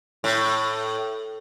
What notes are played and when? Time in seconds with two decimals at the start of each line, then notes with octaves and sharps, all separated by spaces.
0.24 A2